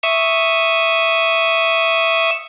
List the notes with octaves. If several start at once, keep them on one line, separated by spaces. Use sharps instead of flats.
E5 C#6 D#6 E6